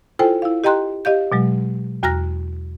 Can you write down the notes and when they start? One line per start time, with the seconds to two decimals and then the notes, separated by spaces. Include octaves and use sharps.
0.19 E4 F4 A4 C5 G5 G#5
0.42 E4 F5
0.64 G4 D#5 G5 A#5 C6 F#6
1.05 G4 D#5 F5 G6
1.32 B2 F#3 G#3
2.03 E2 F#4 A#5 F6 A#6